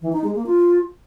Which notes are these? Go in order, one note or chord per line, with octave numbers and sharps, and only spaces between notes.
E3
D#4
G#3
A#3
F4